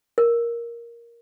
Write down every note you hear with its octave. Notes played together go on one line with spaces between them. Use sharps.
A#4